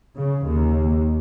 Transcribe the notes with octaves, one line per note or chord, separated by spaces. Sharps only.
C#3
D#2